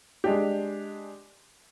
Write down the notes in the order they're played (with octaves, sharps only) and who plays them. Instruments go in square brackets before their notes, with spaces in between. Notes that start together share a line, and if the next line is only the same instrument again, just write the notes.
[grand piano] G#3 D4 G4